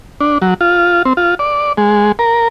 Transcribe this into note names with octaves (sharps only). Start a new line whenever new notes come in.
D4
F#3
F4
C4
F4
D5
G#3
A#4